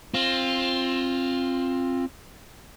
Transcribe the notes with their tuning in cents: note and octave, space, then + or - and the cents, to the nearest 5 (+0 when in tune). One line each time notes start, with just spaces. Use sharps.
C4 +20 F4 +0